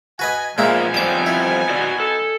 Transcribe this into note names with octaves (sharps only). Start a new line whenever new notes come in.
F#4 B4 D#5 G#5
A#2 F3 G#3 A#3 B3 D#4 E5 G#5
F3 G3 C4 D6 D#6
E4
F#4 D5 D#5
A4